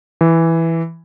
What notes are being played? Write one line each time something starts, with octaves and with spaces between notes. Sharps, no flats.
E3